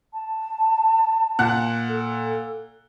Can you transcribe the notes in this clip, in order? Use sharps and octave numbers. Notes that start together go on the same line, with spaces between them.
A5
A#2 F#5 F#6
A4